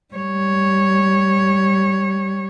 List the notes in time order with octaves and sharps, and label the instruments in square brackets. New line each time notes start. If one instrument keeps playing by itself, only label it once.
[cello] G3 C#5